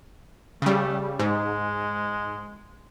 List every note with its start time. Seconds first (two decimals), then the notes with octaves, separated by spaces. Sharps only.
0.62 C#3 G3 A3
1.19 G#2 G#3